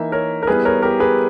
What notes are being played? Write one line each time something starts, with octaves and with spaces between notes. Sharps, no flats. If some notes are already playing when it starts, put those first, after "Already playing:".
Already playing: E3 A#3 D#4 E5
A#4 C#5
A#4
G3 B3 E4 G#4 B4
A#4 C#5
G4 A#4
G#4 B4